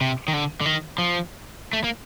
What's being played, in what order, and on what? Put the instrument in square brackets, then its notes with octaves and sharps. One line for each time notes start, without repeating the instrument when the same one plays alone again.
[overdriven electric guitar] C3
D#3
D3
D3
D#3
F3
A3
A#3